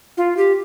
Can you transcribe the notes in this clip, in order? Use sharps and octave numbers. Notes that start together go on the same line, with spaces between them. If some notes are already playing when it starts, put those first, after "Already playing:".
F4
G4